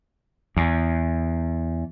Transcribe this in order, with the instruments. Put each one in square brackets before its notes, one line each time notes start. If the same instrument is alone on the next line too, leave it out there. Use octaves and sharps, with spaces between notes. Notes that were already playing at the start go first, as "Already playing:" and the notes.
[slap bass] E2